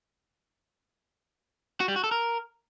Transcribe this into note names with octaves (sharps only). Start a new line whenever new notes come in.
F#4
G3
F#4
A4
A#4